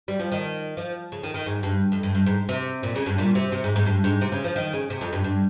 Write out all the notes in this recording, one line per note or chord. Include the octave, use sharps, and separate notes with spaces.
G3
F3
D#3
F3
C#3
D#3
D#3
G#2
G2
F2
G2
G2
G#2
C3
A#2
C#3
G2
A#2
C3
C3
G#2
G#2
G2
G#2
C3
C#3
F3
D#3
C#3
C3
F2
G2
G2